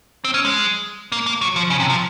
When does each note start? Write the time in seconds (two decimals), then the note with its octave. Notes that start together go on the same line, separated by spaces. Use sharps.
0.25 C4
0.34 C#4
0.45 G#3
1.12 A#3
1.26 A#3
1.41 F#3
1.56 F3
1.70 C#3
1.80 C3
1.90 F3